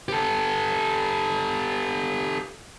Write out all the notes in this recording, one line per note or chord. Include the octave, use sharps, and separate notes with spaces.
G4 A4